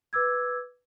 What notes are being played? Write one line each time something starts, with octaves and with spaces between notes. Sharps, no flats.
B4 D6 E6 G#6